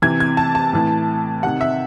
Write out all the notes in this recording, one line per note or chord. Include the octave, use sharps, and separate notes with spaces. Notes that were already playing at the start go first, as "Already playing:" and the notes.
C3 E3 G#6
G#6
A5
A5
A2 E3
C3 D#3 F#5
E5